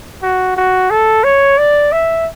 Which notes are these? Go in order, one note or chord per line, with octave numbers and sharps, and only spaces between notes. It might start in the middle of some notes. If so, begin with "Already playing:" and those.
F#4
F#4
A4
C#5
D5
E5